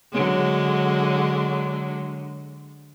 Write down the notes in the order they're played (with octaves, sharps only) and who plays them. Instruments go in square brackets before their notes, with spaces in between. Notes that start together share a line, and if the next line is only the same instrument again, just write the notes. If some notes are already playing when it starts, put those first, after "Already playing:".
[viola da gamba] D3 F#3 G#3